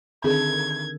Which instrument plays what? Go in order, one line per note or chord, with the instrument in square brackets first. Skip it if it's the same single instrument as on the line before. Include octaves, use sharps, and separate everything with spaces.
[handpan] D3 D#3 A4 [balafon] C4 G#4 [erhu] G#6